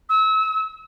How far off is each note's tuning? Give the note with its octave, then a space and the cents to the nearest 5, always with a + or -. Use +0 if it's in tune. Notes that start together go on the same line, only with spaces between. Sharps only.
E6 -30